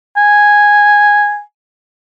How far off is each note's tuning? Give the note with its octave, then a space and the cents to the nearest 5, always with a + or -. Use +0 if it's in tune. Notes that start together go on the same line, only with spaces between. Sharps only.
G#5 -5